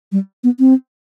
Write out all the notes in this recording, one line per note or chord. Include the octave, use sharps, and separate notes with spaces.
G3
B3
C4